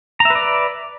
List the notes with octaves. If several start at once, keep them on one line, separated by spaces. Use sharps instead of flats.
B4 D5 E5 A#5